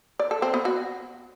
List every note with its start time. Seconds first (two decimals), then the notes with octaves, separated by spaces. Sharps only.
0.19 D5
0.31 A4
0.42 C4
0.54 B3
0.65 F#4